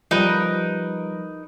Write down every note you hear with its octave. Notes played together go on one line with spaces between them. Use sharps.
F3 G3 D#4 A#4 B4